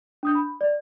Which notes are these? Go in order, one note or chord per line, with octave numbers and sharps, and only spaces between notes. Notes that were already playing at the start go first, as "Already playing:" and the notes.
D4 D#6 G6
B5
D5